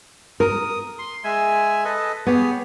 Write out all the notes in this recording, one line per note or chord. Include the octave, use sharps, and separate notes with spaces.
A#4 D#6
C6
G#3 E5 G#5
A4 B4 D#5
B3 G4 G#4 C#5